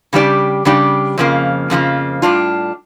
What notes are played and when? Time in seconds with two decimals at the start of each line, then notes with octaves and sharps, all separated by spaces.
0.13 C#3 G3 D4 G4 D5
0.65 C#3 G3 D4 G4 D5
1.18 F2 C#3 F3 A#3
1.70 F2 C#3 F3 A#3
2.22 A2 G3 D4 F4